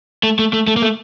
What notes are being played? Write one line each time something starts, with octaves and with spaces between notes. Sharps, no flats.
A3
A3
A3
A3
A#3
A3